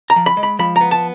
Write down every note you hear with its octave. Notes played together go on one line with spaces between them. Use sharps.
A#5
F3
B5
G#3
B5
F3 B5
A#5
B3
A5